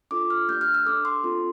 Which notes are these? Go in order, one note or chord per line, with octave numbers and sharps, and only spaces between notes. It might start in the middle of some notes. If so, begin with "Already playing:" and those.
D4 F4 A4 D6
F6
A3 D4 G4 G6
F6
E6
D4 A4 D6
C6
C4 F4 A4